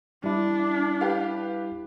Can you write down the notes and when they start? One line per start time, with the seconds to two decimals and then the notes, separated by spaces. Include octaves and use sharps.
0.24 G3 D4 E4
1.01 G4 B4 F5